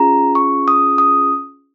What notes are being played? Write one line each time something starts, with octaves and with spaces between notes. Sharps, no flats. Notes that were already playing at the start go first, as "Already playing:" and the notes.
Already playing: C#4 F4 G#4 A#5
C#6
D#6
D#6